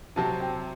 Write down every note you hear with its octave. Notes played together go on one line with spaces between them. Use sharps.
C3 F#3 C4 A5
G5